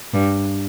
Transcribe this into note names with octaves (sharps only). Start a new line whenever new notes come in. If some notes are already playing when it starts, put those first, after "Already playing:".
G2